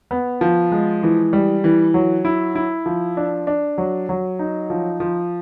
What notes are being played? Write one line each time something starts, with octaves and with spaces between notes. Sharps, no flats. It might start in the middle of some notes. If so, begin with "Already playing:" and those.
B3
F3
G#3
E3
G3
E3
F#3
E4
E4
F3
D4
D4
F#3
F#3
D#4
F3
F3